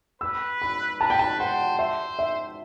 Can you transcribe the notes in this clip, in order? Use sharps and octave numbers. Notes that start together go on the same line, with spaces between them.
B4 E6
B5
B4 A5
G5
A5
C5 F#5
C5 E5
E5